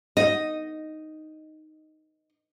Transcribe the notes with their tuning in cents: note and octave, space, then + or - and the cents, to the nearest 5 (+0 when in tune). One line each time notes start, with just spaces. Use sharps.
D#4 +0 D#5 +0